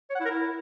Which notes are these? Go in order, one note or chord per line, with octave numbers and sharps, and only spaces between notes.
C#5
F#5
E4
A#4
E4